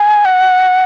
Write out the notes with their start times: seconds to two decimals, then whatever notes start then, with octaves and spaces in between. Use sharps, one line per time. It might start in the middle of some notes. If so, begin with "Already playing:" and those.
Already playing: G#5
0.25 F#5